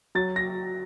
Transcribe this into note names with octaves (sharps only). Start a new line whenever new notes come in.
F#3 A6
A#6